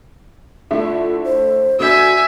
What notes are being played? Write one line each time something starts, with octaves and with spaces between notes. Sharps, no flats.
D3 A3 E4 F4
C5
D3 F#4 E5 G#5 G6